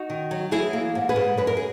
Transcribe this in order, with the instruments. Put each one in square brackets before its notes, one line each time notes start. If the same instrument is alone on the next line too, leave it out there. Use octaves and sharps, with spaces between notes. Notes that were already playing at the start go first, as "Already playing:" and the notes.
Already playing: [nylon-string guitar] D#4 F#4
D#3
F#3
E3 E4 G#4
A#3
G#2
G#4 B4
G#2
F#2 B4
A#4
G#4